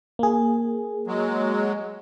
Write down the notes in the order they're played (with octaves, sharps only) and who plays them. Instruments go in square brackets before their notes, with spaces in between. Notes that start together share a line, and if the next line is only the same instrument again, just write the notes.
[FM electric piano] A#3 G#4
[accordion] F#3 G#3